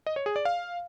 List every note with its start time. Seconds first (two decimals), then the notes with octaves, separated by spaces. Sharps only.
0.07 D#5
0.16 C#5
0.26 G#4
0.36 D5
0.45 F5